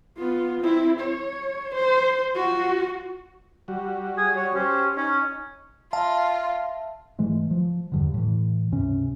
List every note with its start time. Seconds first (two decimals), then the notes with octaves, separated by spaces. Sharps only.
0.18 B3 F4
0.60 C4 E4
1.00 C#5
1.75 C5
2.35 F4 F#4
3.68 G3 F#4
4.18 G#4
4.36 C#5
4.55 C#4 G4 C5
4.97 C#4 D#4
5.93 F4 E5 F5 A5
7.19 G#2 E3 G#3 A3
7.51 F3
7.92 E2 G2 D3
8.14 A2 E3
8.72 C#2 G2 C3 C#4